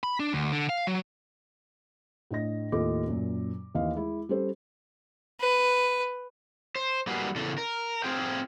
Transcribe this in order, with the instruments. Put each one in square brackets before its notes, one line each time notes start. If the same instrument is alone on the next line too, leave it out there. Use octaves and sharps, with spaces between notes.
[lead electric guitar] B5
D4
D2
D3
F5
F#3
[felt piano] A2 D4 D#5 A#6
D#2 A2 F4 A4 D#5 D6
F#2 A#2
D#2 E3 D#5 F5
G#3 E4
G3 C#4 A4 C5
[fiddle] B4
[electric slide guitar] C5
G3 A#3 F#4 G#4 B4
E2 C#3 A4
A#4
C4 F4 G#4 G5